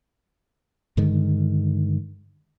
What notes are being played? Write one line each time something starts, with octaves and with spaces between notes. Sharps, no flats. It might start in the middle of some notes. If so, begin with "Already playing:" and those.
G2 D3 D#3 G#3